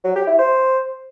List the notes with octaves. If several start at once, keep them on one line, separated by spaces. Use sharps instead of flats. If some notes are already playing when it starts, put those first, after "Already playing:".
F#3
G4
E4
C5